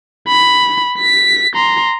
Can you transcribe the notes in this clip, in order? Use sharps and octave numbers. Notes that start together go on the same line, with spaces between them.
B5
B6
A#5 C6